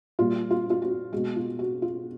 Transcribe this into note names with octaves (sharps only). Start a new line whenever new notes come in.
A#2 G3 F4
F4
F4
F#4
B2 G#3 F#4
F4
F#4
F4